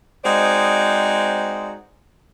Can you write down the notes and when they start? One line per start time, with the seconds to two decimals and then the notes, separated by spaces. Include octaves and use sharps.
0.24 G#3 C4 D#4 F#4 C5 D5